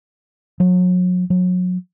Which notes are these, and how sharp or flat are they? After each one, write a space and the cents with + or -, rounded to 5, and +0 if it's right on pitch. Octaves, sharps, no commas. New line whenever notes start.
F#3 -35
F#3 -30